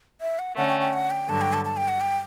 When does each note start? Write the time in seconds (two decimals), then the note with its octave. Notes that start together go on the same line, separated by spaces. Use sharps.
0.21 E5
0.39 F#5
0.57 D3 A3 C#4 F#5
0.69 G5
0.81 G5
0.93 F#5
1.10 G5
1.28 G2 D3 F#3 A5
1.41 G5
1.53 A5
1.65 A5
1.77 G5
1.88 F#5
2.01 G5